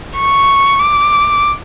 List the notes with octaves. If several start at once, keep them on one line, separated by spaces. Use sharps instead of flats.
C#6
D6